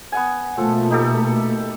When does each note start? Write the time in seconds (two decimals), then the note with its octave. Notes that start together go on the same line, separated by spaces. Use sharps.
0.12 B3 F#5 G#5
0.57 B2 F3 A3 A#3 A4
0.90 D#4 G4 A4